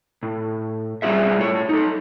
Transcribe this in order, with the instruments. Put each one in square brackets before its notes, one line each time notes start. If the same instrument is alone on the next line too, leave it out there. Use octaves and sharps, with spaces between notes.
[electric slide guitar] A2
G3 C#4 F4 G#4 E5
A2 C#5
D#4 A4